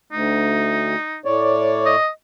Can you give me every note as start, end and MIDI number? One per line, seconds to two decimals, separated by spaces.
0.12 0.95 38
0.12 1.18 63
1.25 1.96 45
1.25 1.96 73
1.25 1.96 74
1.86 2.08 75